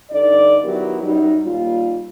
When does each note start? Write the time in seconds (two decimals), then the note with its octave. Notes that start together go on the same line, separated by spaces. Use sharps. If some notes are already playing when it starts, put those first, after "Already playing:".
0.11 G2 D3 D#4 D5
0.63 D#3 F#3 B3 E4 G4 A#4
1.02 F#2 F#3 G3 D#4
1.45 D#2 A#2 G3 F4